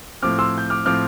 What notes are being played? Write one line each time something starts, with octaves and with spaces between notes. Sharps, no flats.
A2 F3 C4 D6 F6
C6 E6
G6
D6 F6
A2 F3 C4 D6 F6